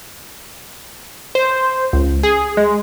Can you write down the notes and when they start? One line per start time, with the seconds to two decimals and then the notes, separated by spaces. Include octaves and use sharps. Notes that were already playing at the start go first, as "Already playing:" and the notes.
1.35 C5
1.93 C#2
2.23 G#4
2.57 G#3